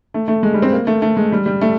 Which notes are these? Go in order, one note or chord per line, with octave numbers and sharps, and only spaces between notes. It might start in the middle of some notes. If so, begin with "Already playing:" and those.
A3
A3
G#3
G3
C4
A#3
A3
A3
G#3
G3
G3
A3